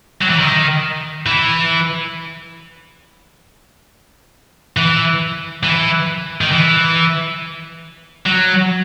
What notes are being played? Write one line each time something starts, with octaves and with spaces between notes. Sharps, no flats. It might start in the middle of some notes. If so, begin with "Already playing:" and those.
F#3
E3
D#3
E3
E3
E3
D#3
E3
F#3